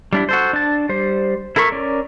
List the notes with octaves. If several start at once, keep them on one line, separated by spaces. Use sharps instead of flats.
G3 D4 E4
F#4 A4 C5
D4 A5
G3 C5
E4 A4 A#4 B5 C#6
C#4 A#4 D5